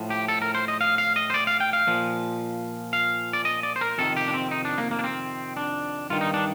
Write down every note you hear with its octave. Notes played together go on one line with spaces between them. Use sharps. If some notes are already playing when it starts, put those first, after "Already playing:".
Already playing: A2 F3
G4
A4
A#4
C5
D#5
F5
F5
D#5
C5
D5
F5
G5
F5
A#2 F3
F5
D5
D#5
D5
C5
A#4
F2 C3 D#3 A4
G4
D4
C4
D#4
D4
A#3
A#3
D4
C4
D4
G2 D#3 F4
D#4
D4